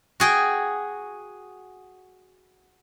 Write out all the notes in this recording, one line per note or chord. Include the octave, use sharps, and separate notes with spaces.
F#4 G#4 G5